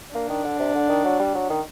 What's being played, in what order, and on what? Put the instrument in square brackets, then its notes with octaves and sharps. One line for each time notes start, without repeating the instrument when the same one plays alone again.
[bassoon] A#3 [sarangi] D4
[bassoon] D#3
D3
C3
D3
D#3
F#3
G3
F#3
D#3